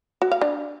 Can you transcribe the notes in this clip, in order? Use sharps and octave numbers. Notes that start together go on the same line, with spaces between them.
F#4
F5
D4